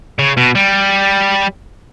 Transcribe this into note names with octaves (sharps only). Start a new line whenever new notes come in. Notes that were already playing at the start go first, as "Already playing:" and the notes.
C#3
B2
G3